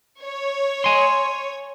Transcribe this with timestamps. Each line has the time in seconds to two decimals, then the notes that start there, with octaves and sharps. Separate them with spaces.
0.23 C#5
0.84 G#5 C6